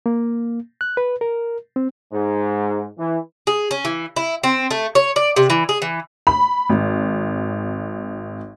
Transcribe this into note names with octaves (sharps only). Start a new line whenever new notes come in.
A#3
F#6
B4
A#4
C4
G#2
E3
G#4
C#4
E3
E4
C4
A3
C#5
D5
C3
E3
G#4
E3
B5
G#1